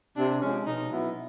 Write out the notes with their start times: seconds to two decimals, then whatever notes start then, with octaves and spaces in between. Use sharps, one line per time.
0.17 C3 D4
0.42 F3 G#3 C#4
0.66 B2 D#4
0.91 F#3 B3 E4